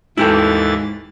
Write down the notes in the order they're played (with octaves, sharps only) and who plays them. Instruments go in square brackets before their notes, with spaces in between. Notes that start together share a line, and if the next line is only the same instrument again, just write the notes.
[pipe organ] D#2 E3 A6 [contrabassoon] G#2 [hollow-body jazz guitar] E4 G4 A4